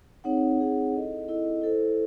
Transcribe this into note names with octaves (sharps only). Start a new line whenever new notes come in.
C4 D#4 G#4 C#5 F#5
C4 D#4 G#4 C#5 F#5
E4 A4 D#5
E4 A4 D#5
E4 A4 C5